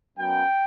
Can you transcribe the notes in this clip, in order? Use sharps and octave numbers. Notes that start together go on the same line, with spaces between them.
F#2 F#3 B3 G5